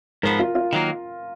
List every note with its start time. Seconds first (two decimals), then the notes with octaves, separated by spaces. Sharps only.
0.23 G#2 F3 B3 A#4
0.39 F4
0.55 F4
0.73 D#3 F#3 A#3